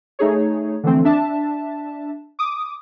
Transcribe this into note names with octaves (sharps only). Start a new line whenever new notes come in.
A3 D#4 G#4 C#5
D3 E3 F3 A3 C4
D4 E5 A5
D6 D#6